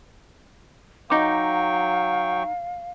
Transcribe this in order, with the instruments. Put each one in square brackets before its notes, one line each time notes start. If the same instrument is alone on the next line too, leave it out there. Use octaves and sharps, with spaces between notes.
[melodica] F#3 G5 C#6 [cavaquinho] D#4 D6 [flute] F5